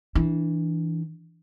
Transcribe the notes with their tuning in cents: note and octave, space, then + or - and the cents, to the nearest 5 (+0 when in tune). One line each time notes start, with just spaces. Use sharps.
E3 -10 D4 +0